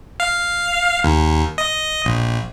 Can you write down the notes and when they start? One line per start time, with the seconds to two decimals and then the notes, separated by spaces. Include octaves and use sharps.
0.20 F5
1.04 D#2
1.58 D#5
2.05 A#1